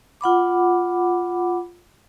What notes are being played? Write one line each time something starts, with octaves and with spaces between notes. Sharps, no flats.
F4 F#5 B5 D6